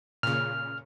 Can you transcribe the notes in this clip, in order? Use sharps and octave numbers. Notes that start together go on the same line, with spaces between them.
A#2 C#3 F6